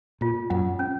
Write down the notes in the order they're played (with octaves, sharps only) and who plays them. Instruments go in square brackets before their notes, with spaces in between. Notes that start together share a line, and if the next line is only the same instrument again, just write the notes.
[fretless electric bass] A#2 [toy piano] F4
[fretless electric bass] F#2 [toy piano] F#5
[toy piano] C#4